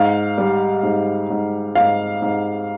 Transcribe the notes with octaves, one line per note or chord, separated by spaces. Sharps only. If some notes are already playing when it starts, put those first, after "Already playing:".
Already playing: G#2 F5
G3
G#2
G#2
G#2 F5
G#2